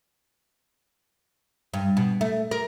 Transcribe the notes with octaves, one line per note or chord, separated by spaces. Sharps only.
G2
B2
A3
A#4